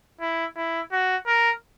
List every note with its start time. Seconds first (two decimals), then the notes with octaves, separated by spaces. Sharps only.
0.21 E4
0.57 E4
0.92 F#4
1.27 A#4